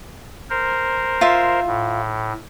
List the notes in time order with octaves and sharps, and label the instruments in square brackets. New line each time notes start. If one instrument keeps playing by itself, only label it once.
[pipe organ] A#4 C5
[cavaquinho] F4 E5
[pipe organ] A2